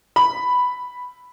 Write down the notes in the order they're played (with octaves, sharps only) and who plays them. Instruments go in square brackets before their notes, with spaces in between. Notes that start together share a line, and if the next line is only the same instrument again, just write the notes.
[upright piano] B5